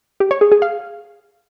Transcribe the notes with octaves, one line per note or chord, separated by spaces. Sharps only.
G4
C#5
G#4
G#4
F5